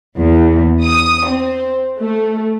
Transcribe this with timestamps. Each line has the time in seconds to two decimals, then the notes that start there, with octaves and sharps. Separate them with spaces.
0.19 E2
0.84 D#6
1.28 C4
2.00 A3